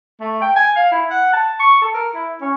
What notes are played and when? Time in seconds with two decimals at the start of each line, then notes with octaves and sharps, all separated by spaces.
0.21 A3
0.42 G5
0.56 G#5
0.76 F5
0.91 E4
1.11 F#5
1.33 A5
1.60 C#6
1.82 A4
1.94 A#4
2.15 E4
2.41 C#4